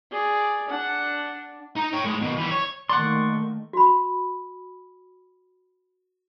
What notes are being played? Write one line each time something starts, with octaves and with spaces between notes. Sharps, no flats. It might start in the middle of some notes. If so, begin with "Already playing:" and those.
G#4 D5
D4 F#5
D#4 A#5
C#5 G5
A2 G#3
B2 D#3
E3 G3
C#5
D#3 A3 A#3 D5 F#5 C6 C#6
F#4 B5